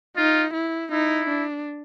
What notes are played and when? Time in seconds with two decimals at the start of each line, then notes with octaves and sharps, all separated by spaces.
0.17 D#4 F4
0.54 E4
0.92 D#4 E4
1.29 D4